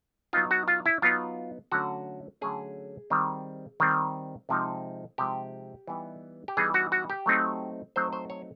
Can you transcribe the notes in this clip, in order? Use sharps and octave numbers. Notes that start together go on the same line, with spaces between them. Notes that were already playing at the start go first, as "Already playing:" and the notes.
F#3 B3 D#4 F4
F#4
F4
E4
F#3 B3 D#4 F4
D3 F#3 A3 C#4 F#4
D3 F#3 A3 C#4 G#4
D#3 G3 C4
D#3 G3 C4
C3 F3 G#3 C4 D#4
C3 F3 G#3 C4 D#4 G4
E3 G3 B3 D#4
G4
E3 G3 B3 D#4 G#4
F#4
F#4
G4
F#3 A3 C4 D#4
F#3 A3 C4 D#4 C5
C5
C#5